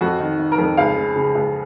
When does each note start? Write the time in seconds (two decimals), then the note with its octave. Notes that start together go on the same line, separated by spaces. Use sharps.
0.01 F2 F#4
0.20 D#3
0.39 D#3
0.52 A#4
0.58 F2
0.77 C#2 F5
0.96 C#3
1.16 C#3
1.35 C#2